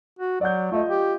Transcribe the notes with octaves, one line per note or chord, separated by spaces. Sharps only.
F#4
F#3 D5 F#5 G6
A3 F4 D#5
G4